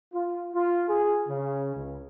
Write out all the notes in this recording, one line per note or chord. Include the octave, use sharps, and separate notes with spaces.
F4
F4
G#4
C#3
C#2